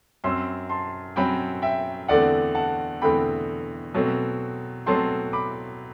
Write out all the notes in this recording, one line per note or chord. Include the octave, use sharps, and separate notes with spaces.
F#2 F#3 C4 C6 E6
A5 C6
F#2 F#3 C4 G5 B5
E5 G5
E2 D3 A3 C4 D5 F#5
F#5 A5
E2 D3 A3 C4 G5 B5
B2 F#3 A3 C4
B2 F#3 A3 C4 A5 C6
B5 D6